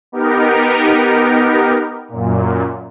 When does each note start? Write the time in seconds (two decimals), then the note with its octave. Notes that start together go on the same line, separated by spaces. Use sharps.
0.12 B3 D#4 G4 A#4
2.08 F#2 A#2